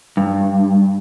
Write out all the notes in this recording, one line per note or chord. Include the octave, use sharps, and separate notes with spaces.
G2